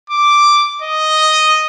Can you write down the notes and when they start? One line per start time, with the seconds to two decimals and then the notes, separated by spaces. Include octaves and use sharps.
0.10 D6
0.82 D#5